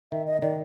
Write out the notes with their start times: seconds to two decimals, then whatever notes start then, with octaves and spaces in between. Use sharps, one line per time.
0.12 D#3 E5
0.27 D#5
0.42 D#3 D5